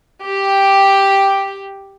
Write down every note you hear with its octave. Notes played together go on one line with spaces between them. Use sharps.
G4